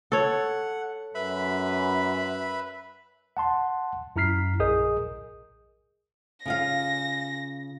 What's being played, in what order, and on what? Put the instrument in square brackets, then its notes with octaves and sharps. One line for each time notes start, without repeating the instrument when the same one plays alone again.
[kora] A4 C#5 [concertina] F#5
[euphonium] F#2 [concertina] B4 E5 B5
[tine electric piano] F#5 A5 C6
F#2 E4 A#5 F6 B6 C7
A#1 G#4 A#4 D#5 D#6 G6
[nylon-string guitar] C#3 F4 F5 [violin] A#6